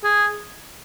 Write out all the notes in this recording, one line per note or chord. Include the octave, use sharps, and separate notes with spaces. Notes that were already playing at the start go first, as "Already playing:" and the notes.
G#4